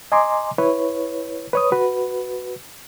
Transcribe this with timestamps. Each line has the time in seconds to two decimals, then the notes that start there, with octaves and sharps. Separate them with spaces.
0.12 D#5 G#5 A#5 C6 D6
0.58 E4 B4 C#5
1.53 B4 C#5 D#6
1.72 F#4 B4